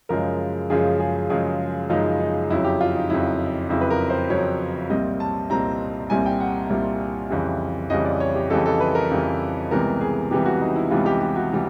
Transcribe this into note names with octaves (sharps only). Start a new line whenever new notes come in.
F#2 C#3 F3 G#3 A#4
F#2 C#3 F3 G#3 G#4
G#4
F#2 C#3 F3 G#3 G#4
F#2 C#3 F3 G#3 D#4
D#4
F2 C#3 F#3 E4
G4
F4
D#4
F2 C#3 F#3 E4
F2 C#3 F#3 E4
B4
A#4
C5
F2 C#3 F#3 C#5
C2 A#2 G3 C4 D#5
A5
C2 A#2 G3 C4 A#5
C2 A#2 G3 C4 G#5
G5
F#5
C2 A#2 G3 C4
F2 C#3 E3 G3
F2 C#3 E3 G3 D#5
D5
C#5
G4
F2 C#3 E3 G3 A4
A4
B4
A#4
F2 C#3 E3 G3
C#2 C3 E3 G3 B3 A#4
G#4
C#2 C3 E3 G3 B3 G4
F#4
D#4
E4
C#2 C3 E3 G3 B3 F4
G4
G4
F#4
C3 E3 G3